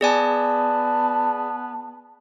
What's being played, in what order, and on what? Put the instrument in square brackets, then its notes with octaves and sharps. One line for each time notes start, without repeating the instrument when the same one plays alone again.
[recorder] B3 [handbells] G#4 D5 G#5 [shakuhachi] A5